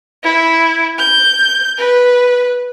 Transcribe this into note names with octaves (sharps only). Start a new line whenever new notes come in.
E4
G6
B4